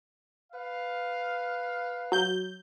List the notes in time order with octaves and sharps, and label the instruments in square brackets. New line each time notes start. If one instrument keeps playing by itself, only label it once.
[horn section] B4 F5
[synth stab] F#3 G6